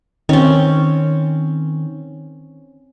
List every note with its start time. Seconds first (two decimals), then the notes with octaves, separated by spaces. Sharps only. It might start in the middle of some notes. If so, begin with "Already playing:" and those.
0.29 D#3 C4 C#4